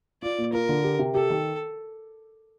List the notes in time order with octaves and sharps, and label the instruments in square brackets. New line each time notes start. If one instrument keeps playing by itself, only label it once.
[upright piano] F4 [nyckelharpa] D5
[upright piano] A#2
[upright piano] F4 [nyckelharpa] A#4
[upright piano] D3
G4
C3
[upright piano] G4 [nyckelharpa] A4
[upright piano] D#3